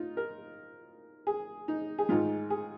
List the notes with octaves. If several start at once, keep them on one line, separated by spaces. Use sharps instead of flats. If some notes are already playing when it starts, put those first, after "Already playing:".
Already playing: D#4 F4
A#4
G#4
D#4
G#4
G#2 D#3 G#3 F4
G#4